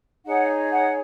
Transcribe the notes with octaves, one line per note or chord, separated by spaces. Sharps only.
D#4 G#4 C#5 F#5
F#5